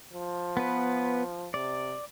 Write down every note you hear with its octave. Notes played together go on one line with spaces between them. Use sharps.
F3
B3 B4
C3 D5